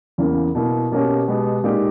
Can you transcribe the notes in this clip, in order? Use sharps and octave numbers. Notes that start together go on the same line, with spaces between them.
E2 C#3 E3 A#3
B2 A#3 E4
B2 A#3 C#4 G4
B2 G#3 B3 G4
A#2 G#3 D#4 G4